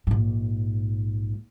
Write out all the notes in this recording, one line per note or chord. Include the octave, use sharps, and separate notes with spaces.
A#1 G#2